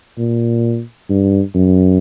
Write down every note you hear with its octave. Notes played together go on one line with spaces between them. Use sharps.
A#2
G2
F#2